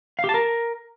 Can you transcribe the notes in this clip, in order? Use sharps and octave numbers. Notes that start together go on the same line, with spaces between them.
F5
G4
A5
A#4